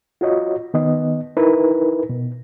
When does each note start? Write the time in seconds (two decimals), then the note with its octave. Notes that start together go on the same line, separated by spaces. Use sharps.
0.21 F4 F#4 C#5 D#5
0.74 D#3 B3 D#5
1.37 D#4 E4 A#4 B4
2.09 B2